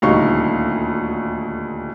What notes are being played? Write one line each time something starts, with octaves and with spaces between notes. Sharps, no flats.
D#1 D2 G3 D#4 F5 C#6